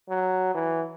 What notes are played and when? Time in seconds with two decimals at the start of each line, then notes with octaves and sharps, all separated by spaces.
0.09 F#3
0.54 E3